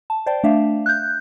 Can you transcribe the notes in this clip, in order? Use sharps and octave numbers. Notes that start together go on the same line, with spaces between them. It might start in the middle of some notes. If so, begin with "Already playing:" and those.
A5
C5 D5 G5 A5
A3 D4 E5 F5
F#6 G6